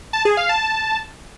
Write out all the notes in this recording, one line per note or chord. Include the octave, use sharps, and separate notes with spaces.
A5
G#4
F5
A5